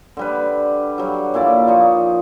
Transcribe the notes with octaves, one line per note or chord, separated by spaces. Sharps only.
D3 G3 B4
F#3 G3
A#2 E4 D5
F3 D#4 C#6